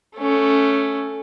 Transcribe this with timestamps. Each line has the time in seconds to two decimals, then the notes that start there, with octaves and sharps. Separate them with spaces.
0.16 A3 C#4